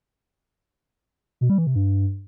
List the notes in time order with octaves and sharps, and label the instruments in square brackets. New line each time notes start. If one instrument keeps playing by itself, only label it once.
[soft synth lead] B2
G3
E3
C3
G2